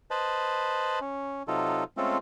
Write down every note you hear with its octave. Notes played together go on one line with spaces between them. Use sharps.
B4 C5 D#5 A5 B5
C#4
C3 F#3 D#4 F4 A4
G#3 A3 C4 C#4 F4 A4